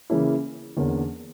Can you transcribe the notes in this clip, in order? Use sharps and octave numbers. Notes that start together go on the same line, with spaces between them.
C#3 E3 A#3 C#4 E4
E2 D3 A#3 C#4